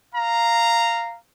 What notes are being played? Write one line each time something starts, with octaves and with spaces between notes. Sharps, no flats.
F5 A#5